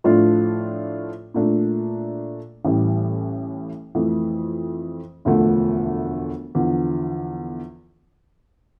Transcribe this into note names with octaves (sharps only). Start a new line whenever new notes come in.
A2 F3 A3 D4 F4
A#2 A3 D4
A1 A2 E3 G3
F2 E3 A3
E1 D2 D3 F3 A3
E2 D3 F3